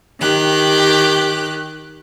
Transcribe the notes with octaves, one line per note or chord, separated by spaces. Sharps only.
D#3 G4 F#6